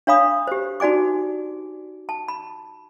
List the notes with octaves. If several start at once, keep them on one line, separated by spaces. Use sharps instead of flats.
D4 C#5 F5 B5 D#6
G4 C5
D#4 F#4 D5 G#5 D6
A5
B5